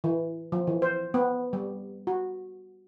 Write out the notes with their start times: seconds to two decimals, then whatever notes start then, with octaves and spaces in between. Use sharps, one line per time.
0.04 E3
0.52 F3
0.67 E3
0.82 C5
1.14 B3
1.53 G3
2.07 F#4